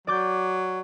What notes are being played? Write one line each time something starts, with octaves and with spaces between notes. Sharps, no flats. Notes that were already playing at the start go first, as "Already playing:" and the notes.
F#3 D5 D6 G6